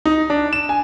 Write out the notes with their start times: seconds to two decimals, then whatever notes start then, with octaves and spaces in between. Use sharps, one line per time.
0.05 D#4
0.30 D4
0.53 E7
0.69 G#5